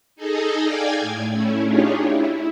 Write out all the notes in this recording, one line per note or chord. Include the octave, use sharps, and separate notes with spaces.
D#4 G#4 A4 D#5
D5 F5 G5 G#5 G#6
A2
A3 C#4 E4
D4 D#4 F4 G4 G#4 C#5
E4